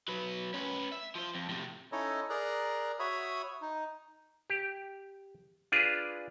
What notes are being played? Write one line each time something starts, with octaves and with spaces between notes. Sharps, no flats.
F#3 B4
C#4 B4
E5
F3 C5
F2
A2 C3
C#4 D#4 E4 A4 C#5 D#5
G#4 A#4 D5 A#5 F#6
F#4 C#5 E5 B5 D#6
D#4
G4
D4 F4 G#4 B4